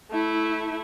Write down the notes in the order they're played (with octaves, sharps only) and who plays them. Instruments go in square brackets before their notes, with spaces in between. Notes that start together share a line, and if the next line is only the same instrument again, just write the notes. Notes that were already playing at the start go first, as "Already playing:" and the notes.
[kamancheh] A3 E4